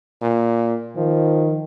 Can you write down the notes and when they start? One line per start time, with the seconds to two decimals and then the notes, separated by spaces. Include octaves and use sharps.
0.22 A#2
0.96 D#3 F3